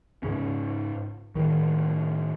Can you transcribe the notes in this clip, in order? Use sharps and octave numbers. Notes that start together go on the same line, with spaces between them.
G#2 C#3 C#4
A2 D#3